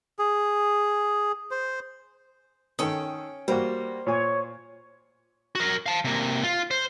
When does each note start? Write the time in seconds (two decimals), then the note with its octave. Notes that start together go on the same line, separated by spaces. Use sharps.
0.19 G#4
1.51 C5
2.79 D#3 C#4 A4 G5 D#6
3.48 G3 A#3 F#4 C5
4.07 A#2 C#5 G#5
5.55 F#4 A#4
5.86 F5 A5
6.05 C3 A#3
6.44 F4
6.71 C5